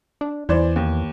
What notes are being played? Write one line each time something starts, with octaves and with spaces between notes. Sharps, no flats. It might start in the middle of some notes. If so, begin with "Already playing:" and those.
D4
E2 E3 C5 D5
D#2